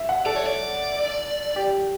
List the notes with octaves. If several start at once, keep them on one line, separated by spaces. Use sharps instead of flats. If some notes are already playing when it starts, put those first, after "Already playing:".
Already playing: E5
F#5
A4 D5
C#5
D5
G4